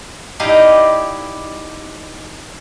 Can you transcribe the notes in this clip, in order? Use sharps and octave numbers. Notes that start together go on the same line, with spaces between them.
D#4 E4 G4 D5 D#5 F5